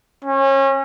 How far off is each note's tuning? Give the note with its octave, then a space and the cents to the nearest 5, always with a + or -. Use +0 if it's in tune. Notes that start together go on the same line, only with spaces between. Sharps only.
C#4 -30